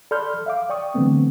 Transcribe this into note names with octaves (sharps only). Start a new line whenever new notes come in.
A4 D5 B5 C6 F6 G6
E5 F5 D6
D5 G5 C#6 D#6
D3 E3 F#3 A3 B3 C4